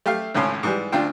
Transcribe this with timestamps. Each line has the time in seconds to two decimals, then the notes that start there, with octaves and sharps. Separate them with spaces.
0.06 A3 G4 E5 F5
0.34 G#1 C#2 A2 C#4 C6
0.63 G#2 E3 G3
0.92 D2 D4 F4 G5